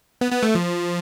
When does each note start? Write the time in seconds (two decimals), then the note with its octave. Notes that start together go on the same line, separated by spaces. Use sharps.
0.21 B3
0.32 B3
0.43 A3
0.55 F3